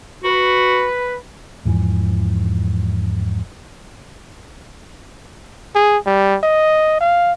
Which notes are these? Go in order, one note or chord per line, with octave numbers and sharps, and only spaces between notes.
F#4 B4
E2 G#2 E3 F3
G#4
G3
D#5
F5